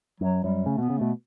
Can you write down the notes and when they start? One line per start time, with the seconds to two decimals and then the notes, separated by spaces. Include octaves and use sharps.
0.20 F#2 F#3
0.44 F#2 G3
0.66 C#3 A3
0.78 B2 B3
0.90 C#3
0.98 B2 A3